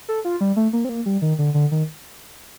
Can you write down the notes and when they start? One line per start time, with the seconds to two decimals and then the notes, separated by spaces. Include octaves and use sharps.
0.09 A4
0.25 F4
0.41 G3
0.56 A3
0.73 A#3
0.85 C4
0.89 A#3
1.06 G3
1.22 D#3
1.39 D3
1.54 D3
1.71 D#3